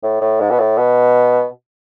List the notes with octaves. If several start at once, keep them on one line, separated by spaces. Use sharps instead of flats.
A2
A2
G#2
B2
A2
B2